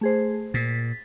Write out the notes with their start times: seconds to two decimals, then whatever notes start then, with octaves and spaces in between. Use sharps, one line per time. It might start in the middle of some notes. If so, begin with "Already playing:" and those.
0.01 A3 G#4 C5
0.54 A#2 A6 B6